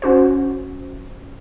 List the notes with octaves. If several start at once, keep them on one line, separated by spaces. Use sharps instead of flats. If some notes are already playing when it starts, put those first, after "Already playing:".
C#4 F#4 C5